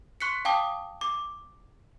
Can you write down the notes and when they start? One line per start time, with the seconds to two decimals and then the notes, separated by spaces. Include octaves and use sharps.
0.21 C6 C#6 F#6 B6 C#7
0.45 F5 G5 A5 D6 D#6
1.01 D6